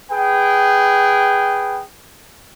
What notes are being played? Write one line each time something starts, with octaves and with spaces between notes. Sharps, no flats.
G#4 B4 G5